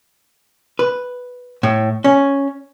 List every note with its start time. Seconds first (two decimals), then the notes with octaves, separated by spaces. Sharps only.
0.79 B4
1.63 A2
2.04 C#4